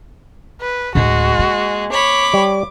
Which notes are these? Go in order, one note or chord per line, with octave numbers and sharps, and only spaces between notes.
B4
D1 G#3 F4 F#4
A#3
C#5 B5 D6
G3